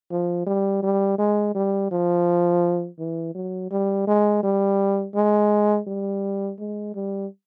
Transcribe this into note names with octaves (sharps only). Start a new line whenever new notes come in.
F3
G3
G3
G#3
G3
F3
E3
F#3
G3
G#3
G3
G#3
G3
G#3
G3